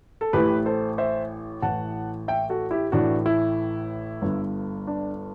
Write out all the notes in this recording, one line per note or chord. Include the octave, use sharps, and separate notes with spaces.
A4
A1 A2 E3 G4 B4
A4 C5
C5 E5
A1 A2 E3 F#5 A5
E5 G5
F#4 A4
E4 G4
A1 A2 E3 D4 F#4
E4
G1 G2 D3
D4